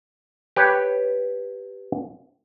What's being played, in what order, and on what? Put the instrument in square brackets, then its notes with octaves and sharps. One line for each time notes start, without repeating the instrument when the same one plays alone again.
[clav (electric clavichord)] G4 B4 C#5